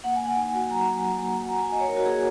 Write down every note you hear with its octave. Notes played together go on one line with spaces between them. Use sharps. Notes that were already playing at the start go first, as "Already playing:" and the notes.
A#3 F#5
G#5
A#3
F#5
D#4 G#5
F#4 G#5
F#3 A#5
F#3
F#4 G#5
A#3
F#4 F#5
A#5
F#4
G#5
F#4 D#5
C#5
D#4 A#4
F#4
A#3 G#4